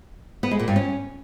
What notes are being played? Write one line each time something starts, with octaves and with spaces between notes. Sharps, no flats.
B3
G#3
A#2
G2
C#4